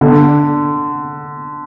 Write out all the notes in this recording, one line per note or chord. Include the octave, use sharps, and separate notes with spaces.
D3